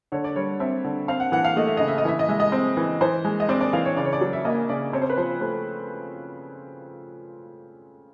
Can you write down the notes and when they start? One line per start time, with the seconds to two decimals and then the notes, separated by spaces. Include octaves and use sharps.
0.12 D3 C#5
0.24 D5
0.36 G3 C#5
0.60 C4 E5
0.84 D3
1.08 C4 F5
1.20 F#5
1.32 E3 F#5
1.44 F5
1.56 A3 D#5
1.67 E5
1.77 C#3 D#5
1.88 E5
1.98 D#5
2.05 E3 E5
2.19 D#5
2.29 G#3 E5
2.40 D#5
2.52 C4
2.77 E3
3.01 E3 C5
3.25 G#3
3.40 D#5
3.49 C4 D5
3.61 D5
3.73 E3 F5
3.85 C#5
3.97 C#3 D5
4.05 C#5
4.13 D5
4.21 F#3
4.33 E5
4.45 A#3 D#5
4.69 C#3 D5
4.93 C4 C#5
5.02 C5
5.10 B4
5.17 F3 C5
5.41 A3 C5